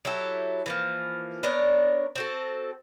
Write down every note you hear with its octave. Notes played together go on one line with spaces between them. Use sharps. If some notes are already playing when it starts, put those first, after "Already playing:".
F#3 E4 G4 A4
E3 F3 A#3
B3 D4 A#4 C#5
C4 F#4 A4